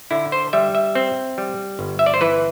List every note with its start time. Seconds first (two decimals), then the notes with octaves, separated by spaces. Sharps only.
0.11 D3 E4
0.32 C5
0.53 G3 E5
0.75 E5
0.95 C4
1.38 G3
1.79 G1
1.99 E5
2.06 D5
2.14 C5
2.21 E3 B4